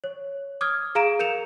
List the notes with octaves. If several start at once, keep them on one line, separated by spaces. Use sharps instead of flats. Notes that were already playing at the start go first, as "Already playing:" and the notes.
C#5
D6 D#6 F6 G#6
G#4 F5 A#5 D7 E7
A#4 G6 C#7 E7 F7